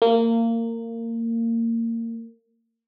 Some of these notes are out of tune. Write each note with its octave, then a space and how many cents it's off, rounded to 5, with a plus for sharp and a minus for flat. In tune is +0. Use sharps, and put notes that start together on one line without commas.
A#3 -25